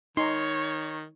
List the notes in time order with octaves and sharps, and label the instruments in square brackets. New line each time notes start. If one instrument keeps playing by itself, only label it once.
[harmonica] D#3 [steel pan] D#4 [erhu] C#5 [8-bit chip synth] C6